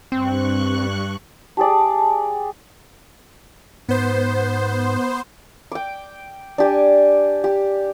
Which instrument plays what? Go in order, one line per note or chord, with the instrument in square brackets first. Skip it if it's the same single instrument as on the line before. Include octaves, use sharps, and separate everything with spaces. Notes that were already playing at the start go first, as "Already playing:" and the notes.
[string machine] G2 C#6 F#6 [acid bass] C4
[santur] G4 G#4 D5 [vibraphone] A5
[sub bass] G#2 [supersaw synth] B3 C5
[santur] G5 D6
D4 G4 G#5
G4